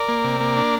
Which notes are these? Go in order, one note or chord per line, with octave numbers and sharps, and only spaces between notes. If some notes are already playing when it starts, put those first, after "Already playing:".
Already playing: A#4 D5
A#3
C3
A#3
D4